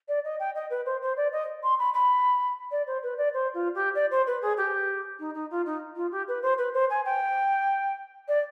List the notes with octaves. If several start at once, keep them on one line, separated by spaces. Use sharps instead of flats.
D5
D#5
G5
D#5
B4
C5
C5
D5
D#5
C6
B5
B5
D5
C5
B4
D5
C5
F4
G4
D5
C5
B4
G#4
G4
D#4
D#4
F4
D#4
F4
G4
B4
C5
B4
C5
G#5
G5
D5